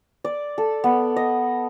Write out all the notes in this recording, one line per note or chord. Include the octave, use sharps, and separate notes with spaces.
D5
A4
B3
D#5